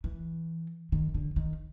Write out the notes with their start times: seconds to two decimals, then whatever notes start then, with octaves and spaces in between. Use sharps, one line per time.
0.04 E3
0.92 D#3
1.14 D3
1.36 D#3